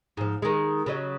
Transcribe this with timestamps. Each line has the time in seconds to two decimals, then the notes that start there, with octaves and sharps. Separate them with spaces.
0.17 G#2 F3
0.42 D#3 G#3
0.86 C#3 F#3 D#5